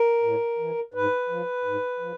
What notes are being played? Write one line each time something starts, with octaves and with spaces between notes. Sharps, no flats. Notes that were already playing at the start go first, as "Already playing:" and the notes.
Already playing: A#4
A2
E3
G#2 B4
F3
G#2
F3